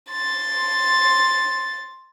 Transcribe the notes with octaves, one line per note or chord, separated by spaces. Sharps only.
C6 A6